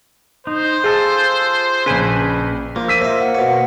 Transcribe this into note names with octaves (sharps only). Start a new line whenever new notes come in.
D#4 C5
F4 G#4 A4 A5
A#1 C#3 B4 G#5 B5
F3 A#3
E6 B6 D#7
C5 D#5 E5
F#5
B2 C#5